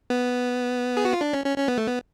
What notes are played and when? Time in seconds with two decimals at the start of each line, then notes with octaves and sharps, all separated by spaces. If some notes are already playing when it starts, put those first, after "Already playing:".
0.10 B3
0.97 G#4
1.05 F#4
1.13 F4
1.21 D4
1.33 C#4
1.46 C#4
1.58 C#4
1.68 B3
1.78 A3
1.87 B3